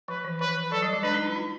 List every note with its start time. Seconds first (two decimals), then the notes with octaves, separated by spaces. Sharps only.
0.08 F3 B4
0.24 E3
0.41 F3 B4
0.72 F#3 A4
0.82 G3
0.93 G#3
1.03 D4 B4
1.14 D#4
1.25 E4
1.36 F4